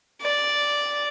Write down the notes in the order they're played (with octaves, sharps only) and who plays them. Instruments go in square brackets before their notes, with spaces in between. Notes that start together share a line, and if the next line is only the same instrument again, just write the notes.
[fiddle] D5